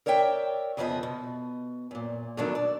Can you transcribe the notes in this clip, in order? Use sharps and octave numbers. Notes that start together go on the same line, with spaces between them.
A#4 C#5 D5 E5 G5
F2 C#3 F3 B3 D#5 E5
B2
F#2 A#2
G2 B2 D#3 F#3 A3 D4
D5